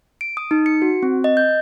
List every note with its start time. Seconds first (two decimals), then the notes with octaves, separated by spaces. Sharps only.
0.21 D7
0.37 D#6
0.51 D#4
0.66 C#7
0.82 F#4
1.03 C4
1.24 D#5
1.37 G6